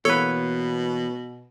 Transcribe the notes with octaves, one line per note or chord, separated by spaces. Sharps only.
B2 E3 A#3 B3 A4 B4 C#5